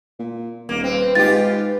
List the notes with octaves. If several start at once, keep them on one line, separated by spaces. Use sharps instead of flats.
A#2
D#1 A#3
C4 B4
G#2 F4 G4 A6